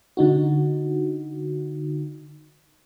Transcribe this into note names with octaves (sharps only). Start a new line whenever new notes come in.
D3 D#4 F#4